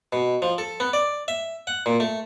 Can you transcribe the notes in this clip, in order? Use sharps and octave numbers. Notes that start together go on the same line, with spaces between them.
B2
F3
A4
B3
D5
E5
F#5
A#2
A3